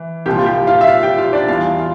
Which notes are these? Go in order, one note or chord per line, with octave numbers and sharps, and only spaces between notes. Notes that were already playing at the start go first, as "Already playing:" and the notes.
Already playing: E3
C2 A#2 F3 G4
F4
G4
F4 F5
E5
F4 F5
G4 G5
F4 F5
D4 D5
E2 E3 G3 F4 F5
F4 F5